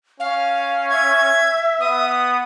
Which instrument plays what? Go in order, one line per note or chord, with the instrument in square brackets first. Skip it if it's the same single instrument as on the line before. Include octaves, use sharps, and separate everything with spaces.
[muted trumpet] C#4 [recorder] F5
[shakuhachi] E5 [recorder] G#6
[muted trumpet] B3 [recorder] D#6